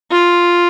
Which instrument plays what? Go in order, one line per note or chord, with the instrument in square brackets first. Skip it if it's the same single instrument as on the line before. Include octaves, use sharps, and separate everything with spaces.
[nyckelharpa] F4